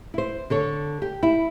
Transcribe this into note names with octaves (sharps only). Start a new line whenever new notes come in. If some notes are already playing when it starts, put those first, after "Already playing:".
E4 C5
D3 A4 C#5
G4
E4